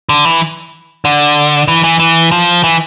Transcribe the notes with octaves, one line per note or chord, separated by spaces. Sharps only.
D3
E3
D3
E3
E3
E3
F3
E3